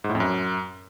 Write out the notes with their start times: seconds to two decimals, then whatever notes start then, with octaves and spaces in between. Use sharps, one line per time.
0.04 G#2
0.09 A2
0.15 F2
0.20 F#2